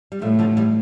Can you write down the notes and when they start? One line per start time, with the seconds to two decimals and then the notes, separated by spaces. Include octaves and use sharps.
0.12 G3
0.21 A2 F3 A3
0.39 D3 F3
0.57 E3 G3